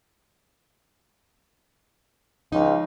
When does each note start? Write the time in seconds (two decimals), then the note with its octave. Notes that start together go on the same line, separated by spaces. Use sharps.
2.52 C#2 F3 D#4